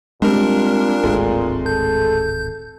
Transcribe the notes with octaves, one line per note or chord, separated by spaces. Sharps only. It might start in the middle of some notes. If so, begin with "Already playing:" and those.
A#2 G3 G#3 A#3 C4 D4 A#4
D1 G#1 G#3 A3 C4
A4 G6